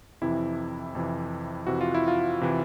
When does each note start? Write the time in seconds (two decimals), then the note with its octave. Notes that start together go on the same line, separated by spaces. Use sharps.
0.21 F2 C3 E3 E4
0.95 F2 C3 E3
1.67 F2 C3 E3 F#4
1.81 F4
1.94 E4
2.08 F4
2.41 C3 E3